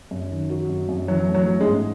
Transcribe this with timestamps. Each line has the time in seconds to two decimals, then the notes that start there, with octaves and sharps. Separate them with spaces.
0.11 F#2
0.30 D#3
0.50 F#3
0.69 F#2
0.89 F#2
1.08 E3 F#3
1.29 A3
1.34 F#3
1.47 C#4
1.61 G#3
1.66 G#2